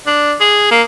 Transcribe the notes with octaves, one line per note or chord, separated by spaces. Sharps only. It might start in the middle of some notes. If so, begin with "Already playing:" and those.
D4
G#4
A#3